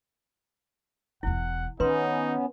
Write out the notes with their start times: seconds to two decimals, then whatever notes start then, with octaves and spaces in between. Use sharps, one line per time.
1.23 E1 E2 E4 F#5
1.80 D#3 B3 C#4 D#4 B4 C6